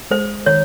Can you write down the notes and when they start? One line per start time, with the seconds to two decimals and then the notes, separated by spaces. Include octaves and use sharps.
0.11 G#3 C5
0.46 D#3 C#5